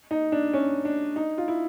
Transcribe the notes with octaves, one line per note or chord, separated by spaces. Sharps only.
D#4
D4
C#4
D4
D#4
F4
E4